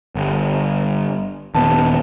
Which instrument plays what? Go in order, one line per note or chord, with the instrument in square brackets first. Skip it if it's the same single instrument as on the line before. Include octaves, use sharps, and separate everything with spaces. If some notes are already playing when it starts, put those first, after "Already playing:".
[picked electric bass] G1
[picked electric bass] D#1 D#2 B3 [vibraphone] A5